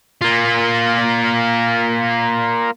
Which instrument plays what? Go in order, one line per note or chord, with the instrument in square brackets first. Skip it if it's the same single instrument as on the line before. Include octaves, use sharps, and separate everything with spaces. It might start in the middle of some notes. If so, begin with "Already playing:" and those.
[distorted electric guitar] A#3 F4